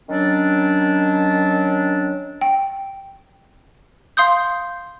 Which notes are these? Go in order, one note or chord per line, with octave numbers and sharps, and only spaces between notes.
D#3 F#3 C#4 D4
G5
F5 C6 D#6 G6